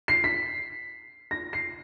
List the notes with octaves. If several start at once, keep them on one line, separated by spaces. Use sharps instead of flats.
C7
B6
A#6
C7